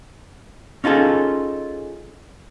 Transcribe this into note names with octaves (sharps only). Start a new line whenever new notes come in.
C#4 D#4 F4 G#4 A4